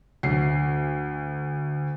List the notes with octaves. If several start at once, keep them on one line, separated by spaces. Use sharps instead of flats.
D2 C7